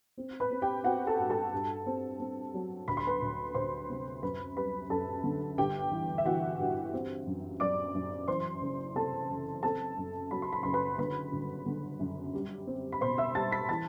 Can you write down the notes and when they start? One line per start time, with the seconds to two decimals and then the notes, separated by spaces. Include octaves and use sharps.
0.18 C4
0.40 B4 B5
0.51 C4
0.62 G4 G5
0.84 C4 F#4 F#5
1.07 A4 A5
1.19 G2
1.30 A4 A5
1.52 G2
1.86 C4
2.20 C4
2.54 F#3
2.88 D2 B5
2.97 C6
3.07 B4 B5
3.22 D2
3.54 D2 C5 C6
3.89 C3
4.22 F#2 B4 B5
4.56 G3 B4 B5
4.90 F#2 A4 A5
5.24 D3
5.58 G1 G4 G5
5.92 E3
6.18 E5
6.25 E3 F#4 F#5
6.59 G2
6.93 C4
7.26 F#2
7.60 F#2 D5 D6
7.94 F#2
8.28 E3 C5 C6
8.62 F#1
8.95 C3 A4 A5
9.29 F#1
9.63 C4 A4 A5
9.98 F#2
10.31 F#3 B5
10.42 C6
10.52 B5
10.63 F#1 C6
10.73 B4 B5
10.98 D3 B4 B5
11.32 G1
11.66 D3
11.99 F#2
12.34 G3
12.67 C4
12.92 B5
13.01 B2 C5 C6
13.18 E5 E6
13.35 G3 A5 A6
13.51 B5 B6
13.69 E3 A5 A6